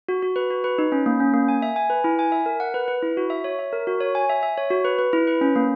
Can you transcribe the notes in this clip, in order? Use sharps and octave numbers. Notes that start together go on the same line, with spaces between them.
F#4
F#4
B4
F#4
B4
D#4
C#4
A#3
C#4
A#3
G#5
E5
G#5
B4
E4
G#5
E5
A#4
F#5
B4
B4
E4
F#4
E5
C#5
E5
A#4
F#4
C#5
G#5
E5
E5
C#5
F#4
B4
B4
E4
B4
C#4
A#3